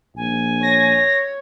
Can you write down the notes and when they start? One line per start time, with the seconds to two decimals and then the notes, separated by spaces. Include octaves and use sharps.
0.16 A#1 G#5
0.63 C#5 A#6